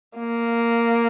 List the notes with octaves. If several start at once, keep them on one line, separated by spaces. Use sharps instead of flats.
A#3